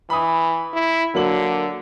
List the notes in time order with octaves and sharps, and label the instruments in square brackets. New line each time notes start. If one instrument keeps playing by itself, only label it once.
[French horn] E3 [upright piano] B5 D#6
[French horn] E4
[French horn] D3 [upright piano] F#3 A#3 F#7